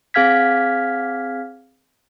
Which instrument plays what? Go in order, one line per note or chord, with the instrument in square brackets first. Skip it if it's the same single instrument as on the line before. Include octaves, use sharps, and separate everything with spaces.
[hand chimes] C4 G#4 F5 F6 G#6 B6